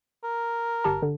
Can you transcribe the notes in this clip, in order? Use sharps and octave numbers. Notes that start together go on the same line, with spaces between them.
A#4
G1 G4 A5
D3